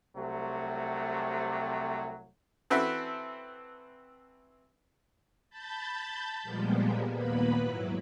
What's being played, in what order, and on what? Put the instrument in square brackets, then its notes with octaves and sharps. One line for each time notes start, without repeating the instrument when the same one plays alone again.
[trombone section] C2 C3 F#3 A3
[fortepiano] E3 C4 F#4 A4 B4 E5
[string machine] A5 B5 G6 A6
A#2 F3 G3 G#3 A#3 B3
D#2 A#2 A#3 B3 B4 B5
G#2 F#3 E4